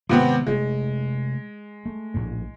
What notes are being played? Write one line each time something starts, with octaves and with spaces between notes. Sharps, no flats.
C3 D#3 E3 G#3 B3 C4
C3 G#3 A3
A3
A#1 A2